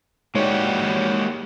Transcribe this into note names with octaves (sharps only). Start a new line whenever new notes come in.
G#2 G#3 A#3 F#4 G4 C#5 D5